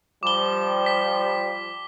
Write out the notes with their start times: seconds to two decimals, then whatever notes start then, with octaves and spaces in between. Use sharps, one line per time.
0.23 F3 G3 D6 G7
0.86 B6